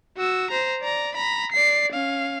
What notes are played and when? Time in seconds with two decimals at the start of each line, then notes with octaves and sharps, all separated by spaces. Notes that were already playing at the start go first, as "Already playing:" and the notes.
0.17 F#4 E6
0.51 C5 A#5
0.82 D5 A#5
1.15 A#5 B5
1.52 D5 C7
1.92 C#4 F5